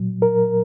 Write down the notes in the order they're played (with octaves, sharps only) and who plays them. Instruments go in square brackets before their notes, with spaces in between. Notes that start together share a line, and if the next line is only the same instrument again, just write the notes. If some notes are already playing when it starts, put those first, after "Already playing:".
Already playing: [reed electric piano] A#2 F#3
A#4